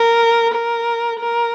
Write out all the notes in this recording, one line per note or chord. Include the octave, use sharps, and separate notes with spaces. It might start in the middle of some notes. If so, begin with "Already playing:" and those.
Already playing: A#4
A#4
A#4